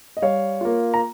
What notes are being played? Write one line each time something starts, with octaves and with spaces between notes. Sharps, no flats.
D#5
G3 C#5 F5
A#3 F4
A#5